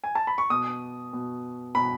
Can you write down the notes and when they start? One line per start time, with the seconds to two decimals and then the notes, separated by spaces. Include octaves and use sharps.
0.04 G#5
0.15 A5
0.27 B5
0.38 C#6
0.50 B2 D#6
1.13 B2
1.75 B2 B5